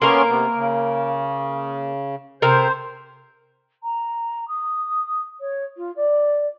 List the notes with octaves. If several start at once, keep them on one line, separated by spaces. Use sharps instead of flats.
A#3 B3 C#4 A#4 C6
C3 B3
C#3
C3 A#4 C5
A#5
D#6
C#5
F4
D5